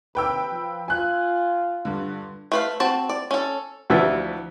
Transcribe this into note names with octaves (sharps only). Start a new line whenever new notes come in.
D#2 C3 B4 G5 E6
F3
F4 G#5 F#6
G2 D3
A3 B4 F5
C4 F#4 A5
D5
C#4 A4
D2 E3 F3 B4 E5